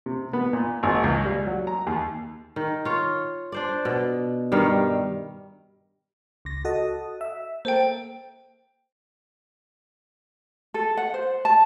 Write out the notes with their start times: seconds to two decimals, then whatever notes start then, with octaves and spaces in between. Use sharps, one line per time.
0.06 C3
0.33 B3
0.53 A#2
0.83 G#1
1.04 C#2
1.25 G3
1.46 F#3
1.67 A#5
1.87 D#2
2.56 D#3
2.85 F4 C#5
3.52 D4 C5 D5
3.85 B2
4.52 G2 D#3 G3 F5
6.45 C#2 A#6
6.65 F#4 A4 D#5
7.21 E5
7.65 A#3 A4 C5 G5
10.74 A4
10.97 F#5
11.14 C5
11.45 A5